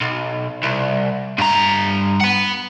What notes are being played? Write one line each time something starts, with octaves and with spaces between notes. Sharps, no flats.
B1
C2
G2 A#5
F#5 B5